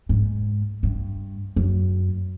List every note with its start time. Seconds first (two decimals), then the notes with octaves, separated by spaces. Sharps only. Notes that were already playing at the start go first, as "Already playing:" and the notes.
0.09 G#2
0.83 G2
1.56 F#2